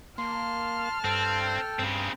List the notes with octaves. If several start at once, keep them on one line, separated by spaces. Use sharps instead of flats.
A#3 A5 C6 F6
G2 C4 A4 G5
G2 C#3 C4